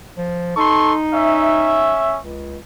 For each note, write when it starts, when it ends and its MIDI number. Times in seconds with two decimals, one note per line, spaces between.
0.17 0.55 53
0.57 1.97 63
0.57 0.93 69
0.57 0.93 84
0.57 0.93 85
1.14 2.16 61
1.14 2.16 76
2.18 2.58 37